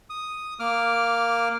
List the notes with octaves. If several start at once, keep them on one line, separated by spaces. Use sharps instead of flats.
D#6
A#3 D6 F6